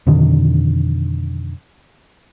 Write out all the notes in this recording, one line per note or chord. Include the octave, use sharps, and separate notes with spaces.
F2 B2 D3 D#3